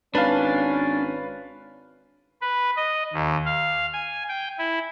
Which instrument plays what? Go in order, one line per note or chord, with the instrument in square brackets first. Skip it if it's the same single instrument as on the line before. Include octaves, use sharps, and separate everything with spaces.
[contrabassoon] G#1 [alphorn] C#4 [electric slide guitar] D4 [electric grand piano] B4 F5
[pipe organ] B4
D#5
D#2
F5
G#5
G5
E4